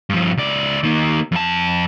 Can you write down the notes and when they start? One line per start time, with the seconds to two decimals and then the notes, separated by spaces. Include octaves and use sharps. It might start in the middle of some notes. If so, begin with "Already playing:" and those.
0.10 G2 F3
0.37 C#2 D5
0.83 D#3 A#3
1.32 F2 A5